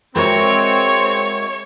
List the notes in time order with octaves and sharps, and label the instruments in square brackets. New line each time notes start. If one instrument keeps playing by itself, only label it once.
[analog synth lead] G#3 [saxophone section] C4 [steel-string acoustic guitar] F#4 A#4 E5 [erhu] C#5